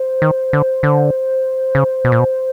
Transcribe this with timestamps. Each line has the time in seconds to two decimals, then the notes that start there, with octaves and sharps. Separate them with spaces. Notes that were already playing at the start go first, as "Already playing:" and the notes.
Already playing: C5
0.22 D#3
0.53 D3
0.83 D3
1.75 C#3
2.05 B2
2.12 A#2
2.19 B2